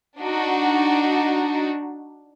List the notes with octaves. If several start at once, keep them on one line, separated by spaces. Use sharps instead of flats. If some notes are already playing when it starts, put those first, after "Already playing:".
D4 D#4 F#4